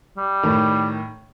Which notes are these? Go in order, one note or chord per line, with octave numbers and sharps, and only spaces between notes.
G3
A2 D#3